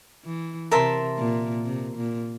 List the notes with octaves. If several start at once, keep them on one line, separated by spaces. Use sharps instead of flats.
E3
C3 A#4 E5 A5 C6
A#2
C3
A#2